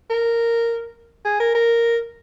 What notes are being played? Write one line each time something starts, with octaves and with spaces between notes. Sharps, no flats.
A#4
G#4
A#4
A#4